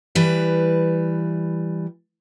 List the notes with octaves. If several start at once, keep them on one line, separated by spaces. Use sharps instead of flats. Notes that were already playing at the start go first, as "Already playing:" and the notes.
E3 G3 B4